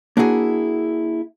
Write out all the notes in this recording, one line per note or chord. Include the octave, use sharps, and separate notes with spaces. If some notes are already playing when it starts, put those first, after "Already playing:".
A#3 D4 E4 F#4 G#4